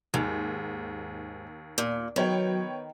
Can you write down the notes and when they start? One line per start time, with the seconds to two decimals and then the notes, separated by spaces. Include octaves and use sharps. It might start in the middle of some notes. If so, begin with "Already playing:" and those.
0.14 D#2 G#2
1.78 A#2
2.16 D#3 F#3 B3 C#5 G5